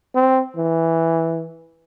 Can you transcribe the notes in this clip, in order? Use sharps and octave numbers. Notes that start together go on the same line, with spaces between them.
C4
E3